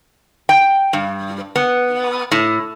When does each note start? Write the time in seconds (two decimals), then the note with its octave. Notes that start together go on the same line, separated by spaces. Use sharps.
0.49 G5
0.93 G2
1.56 B3
2.31 A2